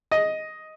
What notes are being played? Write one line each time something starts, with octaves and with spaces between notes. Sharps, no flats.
D#5